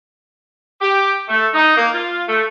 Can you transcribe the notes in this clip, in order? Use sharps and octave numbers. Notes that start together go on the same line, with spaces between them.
G4
A3
D#4
A#3
F4
A3